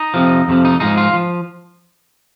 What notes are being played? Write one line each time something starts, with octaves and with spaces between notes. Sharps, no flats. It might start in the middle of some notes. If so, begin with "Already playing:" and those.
Already playing: D#4
F2 C3 F3
F2 C3 F3
D#4
G#2 F3 G#3 D#4
F4
F3